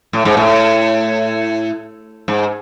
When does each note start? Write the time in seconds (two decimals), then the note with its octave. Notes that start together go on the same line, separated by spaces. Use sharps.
0.13 A2
0.25 G#2
0.37 A2
2.28 G#2